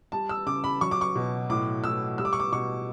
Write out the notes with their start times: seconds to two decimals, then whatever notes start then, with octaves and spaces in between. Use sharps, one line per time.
0.12 G3 A5
0.29 E6
0.46 C#3 D6
0.64 B5
0.81 F#3 C#6
0.91 D6
1.01 C#6
1.15 B2
1.50 A2 D6
1.84 A2 E6
2.18 G3 E6
2.25 D6
2.33 C#6
2.40 D6
2.52 B2 C#6